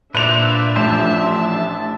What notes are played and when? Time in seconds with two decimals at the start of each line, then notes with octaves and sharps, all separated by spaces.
0.15 A#2 D4 B4 C5 D5 E5 F#6 F7
0.76 A1 F3 C5 A5